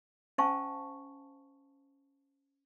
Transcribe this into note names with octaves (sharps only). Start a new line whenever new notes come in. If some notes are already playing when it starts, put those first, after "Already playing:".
C#4 C5 F5 G#5 A5 C#6